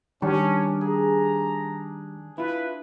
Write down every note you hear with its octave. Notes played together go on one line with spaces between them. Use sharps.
D#3 G3 C#4 D4
G#4 A#5
E4 F4 B4